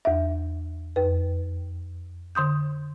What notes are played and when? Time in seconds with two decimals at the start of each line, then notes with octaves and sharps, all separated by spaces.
0.05 E2 E5
0.96 F2 B4
2.35 D3 C6 D#6 G6